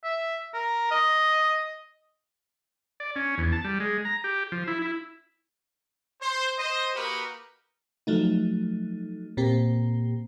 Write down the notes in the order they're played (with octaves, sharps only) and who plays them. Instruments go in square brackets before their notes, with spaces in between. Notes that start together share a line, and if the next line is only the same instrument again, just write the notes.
[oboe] E5
A#4
D#5
[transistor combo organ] D5
C#4
E2
A5
G3
G#3
A#5
G4
F3
E4
E4
[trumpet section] C5
C5 D#5
A#3 D#4 F#4 G4 A#4 B4
[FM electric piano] F3 F#3 A3 D#4
A#2 A#3 C4 G4